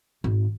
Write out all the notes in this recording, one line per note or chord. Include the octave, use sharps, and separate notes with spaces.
G#1